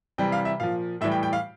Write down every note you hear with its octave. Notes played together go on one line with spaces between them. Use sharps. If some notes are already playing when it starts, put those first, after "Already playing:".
C3 E3 G3 G5
F5
E5
A#2 F3 F5
A2 E3 G3 E5
G5
G5
F5